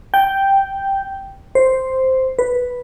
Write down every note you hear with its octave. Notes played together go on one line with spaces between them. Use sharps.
G5
C5
B4